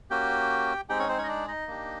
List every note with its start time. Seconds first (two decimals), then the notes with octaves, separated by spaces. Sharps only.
0.10 A#3 C#4 F#4 G4 G5
0.89 G#3 C4 D#4 G4 G#4 G5
0.99 C#4 C#5
1.09 C4 C5
1.18 C#4 C#5
1.24 D#5
1.28 D4 D5
1.48 D#4 D#5
1.67 A#3 D4 G4